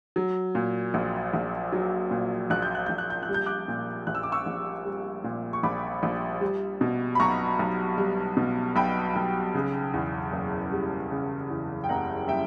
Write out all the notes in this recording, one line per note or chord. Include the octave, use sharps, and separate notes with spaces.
F#3
A#2
A#1
A#1
F#3
A#2
A#1 F#6
G6
F#6
A#1 G6
F#6
G6
F#6
G3
G6
D6 F#6
A#2
A#1 F#6
E6
D6
C#6 E6
A#1
G3
A#2
C#6
A#1 B5 D6
A#1
G3
B2
B5
B1 A#5 C#6
B1
G3
B2
B1 G5 B5
B1
C#3
E2
F#1
G3
C#3
E2
G5
F#1 F#5 A#5
G3 E5 G5